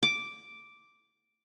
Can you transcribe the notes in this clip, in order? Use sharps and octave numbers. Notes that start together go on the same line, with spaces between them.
D6